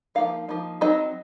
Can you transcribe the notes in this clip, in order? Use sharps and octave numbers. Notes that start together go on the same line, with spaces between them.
F3 A#3 D#4 F5
F3 A#3 D#4
F#3 C4 D#4 D#5